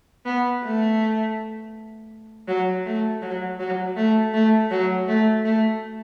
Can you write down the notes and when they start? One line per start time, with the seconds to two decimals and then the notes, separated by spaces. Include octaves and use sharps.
0.26 B3
0.63 A3
2.48 F#3
2.86 A3
3.22 F#3
3.59 F#3
3.96 A3
4.34 A3
4.71 F#3
5.08 A3
5.45 A3